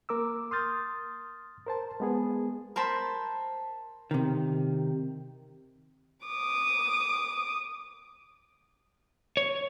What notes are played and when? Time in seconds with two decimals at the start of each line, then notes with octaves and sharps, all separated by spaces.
0.09 A#3 A#4 D6 E6
0.51 C6 D#6 F6 G6 A6
1.66 A#4 C5 A5
2.00 G#3 B3 G#4
2.76 A#4 C5 A5 B5
4.11 C3 D#3
6.26 D6 D#6
9.37 C#5